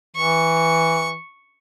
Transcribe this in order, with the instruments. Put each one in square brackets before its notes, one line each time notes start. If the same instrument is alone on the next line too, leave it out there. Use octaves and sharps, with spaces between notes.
[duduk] E3 [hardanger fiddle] C#6